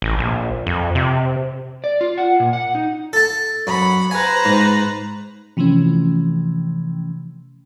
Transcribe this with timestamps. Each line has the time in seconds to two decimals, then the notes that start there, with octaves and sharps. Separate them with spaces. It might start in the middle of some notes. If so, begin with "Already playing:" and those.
0.02 A1
0.19 A#1
0.67 F2
0.95 C3
1.84 D5
2.01 F4
2.18 F#5
2.40 A#2
2.53 F#5
2.75 D#4
3.13 A4 A5
3.67 F#2 F#5 B5
4.11 B4 C5 G#5 A#5
4.45 G#2
5.57 C3 E3 F3 A3 C#4